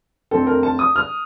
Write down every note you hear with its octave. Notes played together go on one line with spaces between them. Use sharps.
F2 D3 A3 C4 A4
A#4
A5
D#6
F6